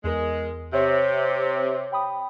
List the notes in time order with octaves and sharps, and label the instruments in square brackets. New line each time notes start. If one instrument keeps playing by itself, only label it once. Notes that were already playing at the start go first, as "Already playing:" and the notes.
[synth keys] E2 A#4 [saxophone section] G#3
[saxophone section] C3 [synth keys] C#5 E5
[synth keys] G5 B5 D#6